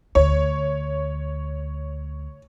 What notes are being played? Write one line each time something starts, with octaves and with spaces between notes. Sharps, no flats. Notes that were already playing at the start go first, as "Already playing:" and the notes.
D2 C#5